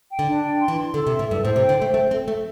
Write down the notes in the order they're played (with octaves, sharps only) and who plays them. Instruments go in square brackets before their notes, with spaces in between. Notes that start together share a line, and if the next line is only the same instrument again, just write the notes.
[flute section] G5
[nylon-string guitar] D3
[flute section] D4
G5
C6
[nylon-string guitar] E3
[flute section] C6
[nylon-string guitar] D3 [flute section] A4
[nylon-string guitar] C3
[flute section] E5
[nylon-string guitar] A2
[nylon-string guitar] G2 [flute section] A4
[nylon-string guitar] A2 [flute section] C5
[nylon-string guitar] C3
[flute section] G5
[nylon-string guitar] D3
[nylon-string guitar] A3 [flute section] C5
[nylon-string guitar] A3 [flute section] A4
[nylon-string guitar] C4 [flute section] A4
[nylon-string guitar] A3 [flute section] A4